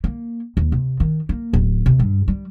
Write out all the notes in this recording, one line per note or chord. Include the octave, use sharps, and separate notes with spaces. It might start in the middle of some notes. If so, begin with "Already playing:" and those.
A#3
D#2
C3
D#3
A#3
D1
C3
G2
G3